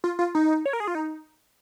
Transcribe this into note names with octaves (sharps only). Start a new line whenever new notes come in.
F4
F4
D#4
C#5
A#4
G#4
F4
D#4